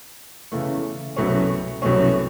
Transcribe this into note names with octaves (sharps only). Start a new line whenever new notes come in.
E2 C#3 E3 A3
C2 B2 F#3 A3 C#4
C2 B2 F#3 A3 C#4